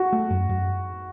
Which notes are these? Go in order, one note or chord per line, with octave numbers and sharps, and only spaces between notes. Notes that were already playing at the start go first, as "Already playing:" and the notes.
Already playing: F#4
A3
F#2
F#2